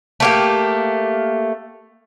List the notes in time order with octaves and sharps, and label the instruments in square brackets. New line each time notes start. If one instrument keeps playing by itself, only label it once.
[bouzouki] A3 A#3 G4